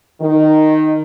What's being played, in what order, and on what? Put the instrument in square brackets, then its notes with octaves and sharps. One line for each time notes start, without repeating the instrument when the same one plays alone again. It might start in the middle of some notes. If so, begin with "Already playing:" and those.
[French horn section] D#3